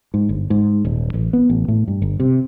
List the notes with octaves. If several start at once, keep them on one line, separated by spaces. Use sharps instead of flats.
G#2
G1
G#2
D#1
A1
B3
A1
A2
G2
G1
C3